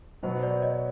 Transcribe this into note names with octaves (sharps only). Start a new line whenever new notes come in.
B2 F#3 B3 C5
C5 D5
C#5 D#5